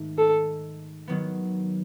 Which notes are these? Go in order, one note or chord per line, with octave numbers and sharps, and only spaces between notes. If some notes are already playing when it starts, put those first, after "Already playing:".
Already playing: G#2 D#3 A3
A4
D#3 F#3 B3